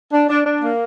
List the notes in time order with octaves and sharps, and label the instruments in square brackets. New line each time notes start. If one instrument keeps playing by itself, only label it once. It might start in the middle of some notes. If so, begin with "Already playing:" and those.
[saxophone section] D4
D4
D4
A#3